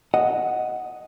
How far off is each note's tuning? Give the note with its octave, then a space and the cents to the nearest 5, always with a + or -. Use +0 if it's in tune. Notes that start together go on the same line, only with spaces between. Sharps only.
D#5 +0 F#5 +0